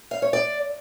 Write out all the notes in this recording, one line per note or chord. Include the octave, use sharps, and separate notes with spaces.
F5
C#5
D5